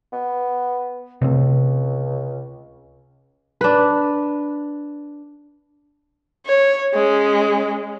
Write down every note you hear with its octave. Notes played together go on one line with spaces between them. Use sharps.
B3
C#2 C3 A3 C4
D4 B4
C#5
G#3 C#4